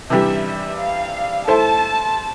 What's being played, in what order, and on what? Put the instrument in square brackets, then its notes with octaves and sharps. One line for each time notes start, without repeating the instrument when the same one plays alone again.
[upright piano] C3 E3 G3 D4 G4 [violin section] E5
[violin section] E5
F5
[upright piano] A3 E4 A4 C5 [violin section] A5